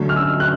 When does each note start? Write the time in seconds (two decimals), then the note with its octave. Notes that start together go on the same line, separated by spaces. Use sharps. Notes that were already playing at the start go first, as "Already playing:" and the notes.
Already playing: D3 F#3 A3
0.09 F6
0.16 E6
0.40 F#6